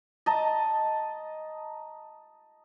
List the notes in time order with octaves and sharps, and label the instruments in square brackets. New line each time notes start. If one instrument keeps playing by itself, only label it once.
[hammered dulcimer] D#5 A5 A#5